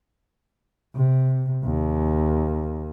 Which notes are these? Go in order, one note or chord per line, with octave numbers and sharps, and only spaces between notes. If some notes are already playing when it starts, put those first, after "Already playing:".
C3
D#2